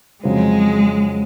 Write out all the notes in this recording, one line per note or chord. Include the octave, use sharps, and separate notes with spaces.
F2 C#3 F#3 G#3 C4